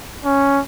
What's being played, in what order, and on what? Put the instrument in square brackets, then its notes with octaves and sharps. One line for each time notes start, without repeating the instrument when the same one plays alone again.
[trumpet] C#4